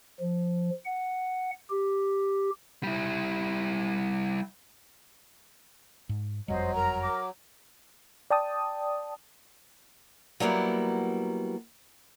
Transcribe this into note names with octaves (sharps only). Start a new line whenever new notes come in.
F3
F#5
G4
G3 E4
G#2
F#1 F2 F#3 G3 C5 D#5
A#4 A#5
D6
D5 G5 A5 D#6
F#3 G3 A#3 B3 E4